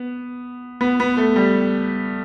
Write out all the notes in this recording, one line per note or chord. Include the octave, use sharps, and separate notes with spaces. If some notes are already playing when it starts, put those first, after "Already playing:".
Already playing: B3
B3
B3
A3
G3